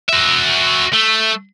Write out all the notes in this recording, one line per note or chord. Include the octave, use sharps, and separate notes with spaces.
F#4 E5
A3